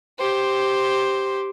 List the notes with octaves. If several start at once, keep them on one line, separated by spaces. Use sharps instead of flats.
G4 C5